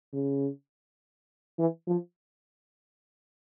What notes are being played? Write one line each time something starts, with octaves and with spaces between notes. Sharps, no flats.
C#3
E3
F3